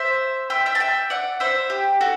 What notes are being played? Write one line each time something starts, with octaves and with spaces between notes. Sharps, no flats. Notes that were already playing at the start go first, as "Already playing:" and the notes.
Already playing: C5 E5
E5 G5
E5 G5
A5
E5 G5
D5 F#5
C5 E5
G4
F#4 A4